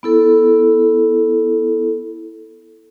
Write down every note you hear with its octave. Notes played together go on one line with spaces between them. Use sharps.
B3 E4 A4